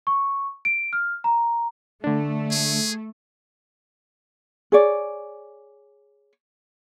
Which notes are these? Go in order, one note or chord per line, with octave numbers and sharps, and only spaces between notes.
C#6
D7
F6
A#5
D3 A3 D4
G#4
G#4 C#5 D5